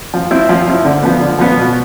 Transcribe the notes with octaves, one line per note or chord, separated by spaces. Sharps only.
F3
C4 E4
F3
C4 E4
D3
F3 B3
D3
F3 B3
B2